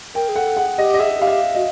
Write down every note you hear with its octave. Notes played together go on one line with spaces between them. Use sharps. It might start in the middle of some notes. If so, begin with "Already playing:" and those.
A#4 G5
G#4
A4 F#5
G#4 F#5
G4 D#5
D#5
G#4 E5
G4 F5
E5
F#4 D#5